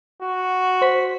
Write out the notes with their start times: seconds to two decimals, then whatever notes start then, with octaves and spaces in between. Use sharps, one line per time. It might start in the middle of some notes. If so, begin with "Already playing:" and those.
0.23 F#4
0.82 C5 B6